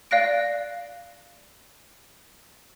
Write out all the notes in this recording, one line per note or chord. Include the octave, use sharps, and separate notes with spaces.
D5 F5 F#6 A#6 D7